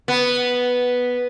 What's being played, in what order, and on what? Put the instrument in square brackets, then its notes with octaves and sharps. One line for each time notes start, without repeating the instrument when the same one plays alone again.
[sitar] B3